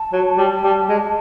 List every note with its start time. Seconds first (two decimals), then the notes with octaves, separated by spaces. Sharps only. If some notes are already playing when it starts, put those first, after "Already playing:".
Already playing: A5
0.13 F#3
0.38 G3
0.64 G3
0.89 G#3